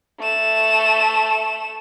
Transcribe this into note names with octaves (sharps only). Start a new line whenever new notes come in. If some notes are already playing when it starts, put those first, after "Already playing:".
A3 E7